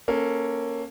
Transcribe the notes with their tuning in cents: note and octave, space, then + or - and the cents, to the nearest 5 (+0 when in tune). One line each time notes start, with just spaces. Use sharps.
A#3 +0 C#4 -10 A4 +15